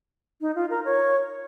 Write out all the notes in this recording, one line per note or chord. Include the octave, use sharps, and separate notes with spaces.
D#4
F4
A#4
C#5